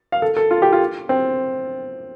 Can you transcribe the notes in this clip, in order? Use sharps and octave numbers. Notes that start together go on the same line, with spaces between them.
F5
A4
A4
F4
G4
F4
C4